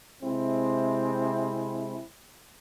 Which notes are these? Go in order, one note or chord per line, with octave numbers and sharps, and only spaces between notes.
C3 G#3 C4 E4